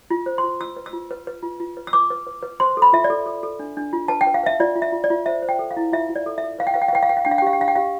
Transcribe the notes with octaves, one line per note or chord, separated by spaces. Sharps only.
F4
C5
C6
F4
F4 E6
B4
E6
F4
B4
B4
F4
F4
B4
E6
B4 D6
B4
B4
B4
C5 C6
A4
B5
F4 E5
D5
A4
A4
A4
D4
D4
F4
B4 A5
G5
B4
F5
B4 E5
F4 D5
F4
E5
F4
D5
F4
C5 E5
C5
G5
A4
F5
E4
F4 E5
F4
D5
A4
E5
A4
B4 F5
G5
B4 F5
G5
F5
B4 G5
F5
B4 G5
F5
D4 G5
F5
G5
G4 F5
G5
D4 F5
G5
G4 F5